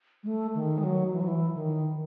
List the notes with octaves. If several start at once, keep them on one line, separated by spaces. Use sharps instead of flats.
G#3
A3
D#3
G#3
F#3
E3
F#3
E3
D#3